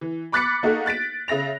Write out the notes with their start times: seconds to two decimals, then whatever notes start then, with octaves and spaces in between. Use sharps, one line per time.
0.01 E3
0.32 B5 D6 F#6 A6 B6 C#7
0.63 A#3 D#4 F#4 G#4 A4
0.86 F#6 A6 B6 D7
1.28 C#3 E5 A#6 F7